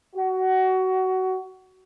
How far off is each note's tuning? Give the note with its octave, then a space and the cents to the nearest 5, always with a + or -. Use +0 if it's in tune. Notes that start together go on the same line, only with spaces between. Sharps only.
F#4 +20